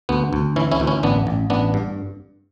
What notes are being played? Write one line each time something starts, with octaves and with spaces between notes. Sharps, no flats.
D2 B3
D2
E3 C#4 E4
C#4 E4
D2
C#4 E4
A1 B3 D4
A1
A1 B3 D4
G2